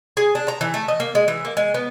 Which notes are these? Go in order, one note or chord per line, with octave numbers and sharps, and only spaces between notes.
G#4
D4
A#5
E3
A3
D#5
A#3
G#3
E3
A#3
G#3
B3